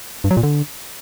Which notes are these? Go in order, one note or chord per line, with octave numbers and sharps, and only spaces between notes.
G2
F#3
A#2
D3